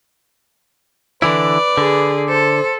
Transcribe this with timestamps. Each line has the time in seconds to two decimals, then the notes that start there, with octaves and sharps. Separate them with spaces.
1.22 D3 E3 E4 B4 D5
1.78 D3 G#4
2.29 A4 C5